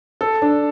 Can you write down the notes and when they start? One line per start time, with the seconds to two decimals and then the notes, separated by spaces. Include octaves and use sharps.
0.21 A4
0.42 D4